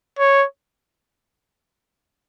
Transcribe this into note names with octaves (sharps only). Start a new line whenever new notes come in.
C#5